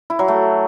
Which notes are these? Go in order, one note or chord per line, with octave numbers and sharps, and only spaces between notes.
E4
F#3
A3